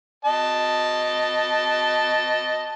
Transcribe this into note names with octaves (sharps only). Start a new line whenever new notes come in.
D#5 A5